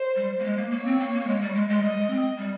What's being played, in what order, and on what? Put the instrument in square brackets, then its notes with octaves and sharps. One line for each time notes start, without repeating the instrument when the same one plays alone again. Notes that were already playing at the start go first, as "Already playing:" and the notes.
Already playing: [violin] C5
[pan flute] G3
A#3
G#3
A#3
[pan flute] A#3 [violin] C#5
[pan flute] C4
A#3
A#3
G#3
G3
G#3
G#3
[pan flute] G3 [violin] D#5
[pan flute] G#3
C4
G3